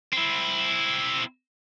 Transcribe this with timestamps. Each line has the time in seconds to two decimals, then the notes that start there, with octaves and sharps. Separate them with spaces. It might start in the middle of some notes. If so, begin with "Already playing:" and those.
0.13 C4 E4